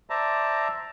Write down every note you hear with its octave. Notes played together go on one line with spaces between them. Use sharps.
C5 D5 E5 A5 A#5